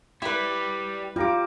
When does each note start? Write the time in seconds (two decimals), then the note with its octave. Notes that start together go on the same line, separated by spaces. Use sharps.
0.22 G3 E4 B4
1.16 G3 F4 G4 A#5 D6